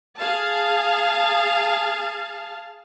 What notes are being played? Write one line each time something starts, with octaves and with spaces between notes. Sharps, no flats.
G#4 F5 A5